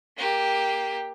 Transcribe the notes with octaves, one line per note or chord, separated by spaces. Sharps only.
A#3 G4